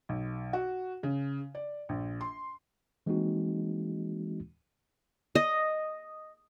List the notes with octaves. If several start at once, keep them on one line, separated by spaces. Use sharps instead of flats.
B1
F#4
C#3
D5
A#1
C6
E3 G#3 A#3 C4 D#4 F#4
D#5